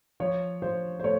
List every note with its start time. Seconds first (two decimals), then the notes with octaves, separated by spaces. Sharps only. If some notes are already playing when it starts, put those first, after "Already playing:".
0.20 F3 C#5
0.62 F3 C5
1.00 C5
1.04 A3 C#5